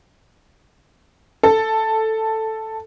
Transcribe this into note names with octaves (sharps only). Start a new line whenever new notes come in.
A4